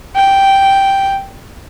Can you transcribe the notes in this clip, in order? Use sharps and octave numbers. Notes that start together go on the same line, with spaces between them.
G5